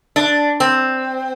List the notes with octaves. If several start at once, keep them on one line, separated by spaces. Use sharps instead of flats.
D4
C4